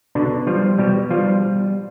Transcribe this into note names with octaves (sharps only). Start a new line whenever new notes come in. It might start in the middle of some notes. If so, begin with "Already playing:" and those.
B2 D3 D4
F3 G3 F4
B2 G3 G4
F3 G3 F4